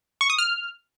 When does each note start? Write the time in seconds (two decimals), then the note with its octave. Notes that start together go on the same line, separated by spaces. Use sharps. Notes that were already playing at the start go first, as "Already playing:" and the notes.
0.21 C#6
0.30 D#6
0.38 F6